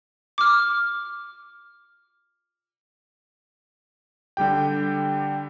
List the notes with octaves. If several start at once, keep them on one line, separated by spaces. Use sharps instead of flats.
D6 F6
D3 G3 G4 G5